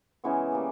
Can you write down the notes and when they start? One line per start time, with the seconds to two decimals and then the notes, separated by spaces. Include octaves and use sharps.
0.24 C#3 E3 G#3 B3
0.52 G3 A#3